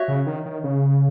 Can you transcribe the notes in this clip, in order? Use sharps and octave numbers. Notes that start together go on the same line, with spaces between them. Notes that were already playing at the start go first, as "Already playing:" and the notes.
Already playing: F#4 C#5 E5
C#3
D#3
D#3
C#3